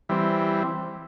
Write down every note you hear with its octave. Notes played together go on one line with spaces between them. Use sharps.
E3 G3 C4